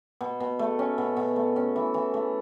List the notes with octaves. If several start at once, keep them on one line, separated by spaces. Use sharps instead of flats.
B2
B2
A3
C#4
B2
B2
A3
C#4
E3
E3
A3